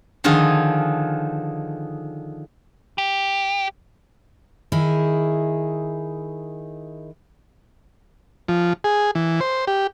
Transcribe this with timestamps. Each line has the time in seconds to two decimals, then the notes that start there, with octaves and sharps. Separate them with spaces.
0.24 D3 D#3 F3 F4 G#4
2.98 G4
4.72 D#3 E4 G#4
8.48 F3
8.84 G#4
9.15 E3
9.41 C5
9.67 G4